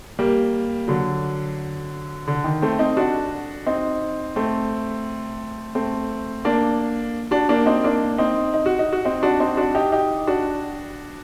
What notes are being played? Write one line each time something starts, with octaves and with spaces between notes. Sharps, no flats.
G3 A#3
D3 F#3
D3
D#3
A3 C4
C4 D#4
D4 F#4
C4 D#4
A3 C4
A3 C4
A#3 D4
D4 F#4
A#3 D4
C4 D#4
A#3 D4
C4 D#4
D#4
F#4
D#4
F#4
C4 D#4
D4 F#4
C4 D#4
D4 F#4
D#4 G4
D#4 G4
D4 F#4